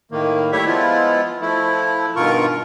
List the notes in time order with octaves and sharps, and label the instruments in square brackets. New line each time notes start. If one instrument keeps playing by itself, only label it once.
[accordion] A2 D#3 A#3
G3 A3 E4 G4 C#5 E5
F3 G#3 B3 E4 F4
F3 A3 E4
G2 B2 D#3 F4 A#4 C#6